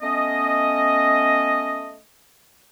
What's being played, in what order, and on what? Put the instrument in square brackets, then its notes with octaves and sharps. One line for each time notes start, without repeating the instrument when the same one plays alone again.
[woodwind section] A3 B3 C#4 D#5